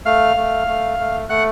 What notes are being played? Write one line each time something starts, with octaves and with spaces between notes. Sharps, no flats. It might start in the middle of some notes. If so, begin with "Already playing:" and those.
A3 F5 F6
A3
A3
A3
A3 F#5 F#6